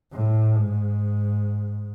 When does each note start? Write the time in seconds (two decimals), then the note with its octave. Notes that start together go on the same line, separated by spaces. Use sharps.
0.13 A2
0.56 G#2